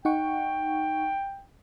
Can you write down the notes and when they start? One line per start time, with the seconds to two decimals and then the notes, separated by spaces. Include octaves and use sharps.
0.05 D#4 F#5 G5 C#6